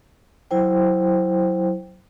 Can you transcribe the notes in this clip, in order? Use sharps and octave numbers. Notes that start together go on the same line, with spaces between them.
F#3 E4 C5 G5